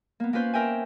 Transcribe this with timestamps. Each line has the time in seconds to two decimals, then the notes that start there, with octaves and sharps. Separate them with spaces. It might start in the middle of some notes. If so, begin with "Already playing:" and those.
0.20 A#3 B3
0.33 A#3 C#4 F4 B4 C5
0.54 A#4 E5 G5 G#5